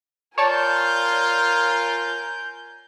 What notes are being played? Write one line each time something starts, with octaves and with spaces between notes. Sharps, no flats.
F4 A#4 C#5 D5 G#5 A5 G6